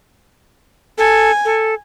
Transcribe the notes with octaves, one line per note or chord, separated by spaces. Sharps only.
A4 G#5
A4